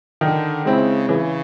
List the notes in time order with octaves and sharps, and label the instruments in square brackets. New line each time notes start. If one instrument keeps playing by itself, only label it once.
[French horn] D3 [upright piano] D#3
[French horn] C#3 [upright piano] G#3 C4 E4
[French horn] C#3 [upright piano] E3